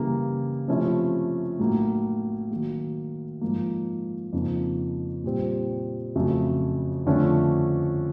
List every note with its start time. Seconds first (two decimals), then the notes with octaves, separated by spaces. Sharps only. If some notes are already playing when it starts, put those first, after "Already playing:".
Already playing: C#3 E3 G3 A#3
0.68 C3 F3 A3 C#4 E4
1.59 A2 F#3 A#3 D#4
2.51 D#3 F#3 A#3
3.41 G#2 F3 A#3
4.33 F2 C#3 F3 A#3 D#4
5.24 A#2 G3 C4
6.15 F2 C#3 F#3 A3
7.06 F2 D3 F3 A3 C#4